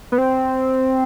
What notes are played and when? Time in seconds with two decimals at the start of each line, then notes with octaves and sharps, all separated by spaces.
0.12 B3
0.18 C4